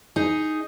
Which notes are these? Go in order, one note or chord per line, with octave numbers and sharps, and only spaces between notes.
D#4 G#4